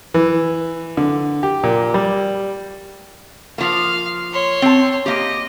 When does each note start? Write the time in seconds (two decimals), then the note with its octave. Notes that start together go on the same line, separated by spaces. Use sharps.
0.14 E3
0.97 D3
1.43 G4
1.63 A#2
1.94 G3
3.58 F3 A#3 F5
4.32 C#5 C6
4.62 C4 A5
5.06 A#3 G4 D#5